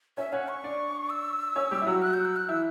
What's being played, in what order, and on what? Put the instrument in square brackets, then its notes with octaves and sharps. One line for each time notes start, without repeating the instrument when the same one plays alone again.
[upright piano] C#4 C#5 [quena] E5
[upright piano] C#4 C#5 [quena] F#5
[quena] C#6
[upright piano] D4 D5
[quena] E6
[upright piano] C#4 C#5
G3 G4
E4
F#3 F#4
[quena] F#6
G6
E6
F#6
[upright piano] E3 E4 [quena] E6